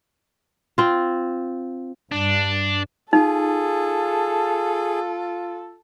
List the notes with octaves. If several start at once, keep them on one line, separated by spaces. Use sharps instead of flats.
C4 F4
G2 D4
D#4 F4 G#4 A4